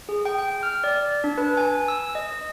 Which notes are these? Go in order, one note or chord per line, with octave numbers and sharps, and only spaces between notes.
G#4
G5
G5
F6
D5
D4
B4
G#5
E6
D#5